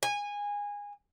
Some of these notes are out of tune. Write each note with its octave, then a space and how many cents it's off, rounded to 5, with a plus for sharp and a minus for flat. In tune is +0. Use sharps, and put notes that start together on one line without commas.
G#5 -20